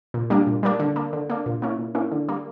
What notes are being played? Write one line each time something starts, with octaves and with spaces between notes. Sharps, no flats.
A#2
G3 A#3 D4
A#2
G3 A#3 D4
D3
A#3 D4
D3
A#3 D4
A#2
A#3 C#4 E4
A#2
A#3 C#4 E4
D3
G3 A#3